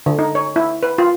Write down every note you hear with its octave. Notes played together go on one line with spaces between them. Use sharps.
D3
D#4
C#5
E4
B4
F4